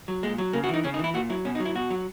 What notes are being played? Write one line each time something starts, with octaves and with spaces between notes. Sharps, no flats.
F#3
A#2 G#3
F#3
C#3 A#3
F#4
E3 D#4
C#3 C#4
D#4
E3 E4
A#2 F#4
F#3 E4
B2 C#4
D#4
F#3
E4
B2 F#4
F#3